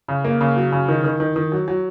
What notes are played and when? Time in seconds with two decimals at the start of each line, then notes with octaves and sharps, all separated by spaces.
0.08 C#3
0.25 A#3
0.41 C#3
0.56 F#3
0.72 C#3
0.88 D#3
1.04 D#3
1.20 D#3
1.36 D#3
1.52 F#3
1.68 F#3